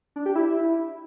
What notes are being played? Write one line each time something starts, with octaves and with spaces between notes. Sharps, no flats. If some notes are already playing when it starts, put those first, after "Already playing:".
D4
G4
E4